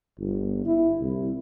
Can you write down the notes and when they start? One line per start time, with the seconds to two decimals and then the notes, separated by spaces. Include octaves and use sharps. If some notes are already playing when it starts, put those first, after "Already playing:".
0.20 G1
0.66 E4
1.00 C2